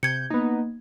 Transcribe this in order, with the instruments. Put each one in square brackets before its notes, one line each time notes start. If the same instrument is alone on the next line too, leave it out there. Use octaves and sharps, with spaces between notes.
[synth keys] C3 G6 [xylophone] G#6 C#7
[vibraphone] A#3 [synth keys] B3 D#4